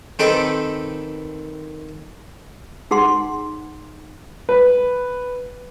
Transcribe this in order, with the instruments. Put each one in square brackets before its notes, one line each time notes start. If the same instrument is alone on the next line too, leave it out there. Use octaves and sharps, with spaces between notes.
[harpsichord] D#3 C4 A4 B4 D#5 D6
[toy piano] D#4 G#4 F#5 C6
[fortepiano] B4